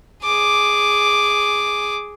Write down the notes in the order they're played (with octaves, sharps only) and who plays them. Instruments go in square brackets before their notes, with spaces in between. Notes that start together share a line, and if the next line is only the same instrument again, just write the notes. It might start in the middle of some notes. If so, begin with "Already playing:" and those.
[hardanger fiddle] G#4 D6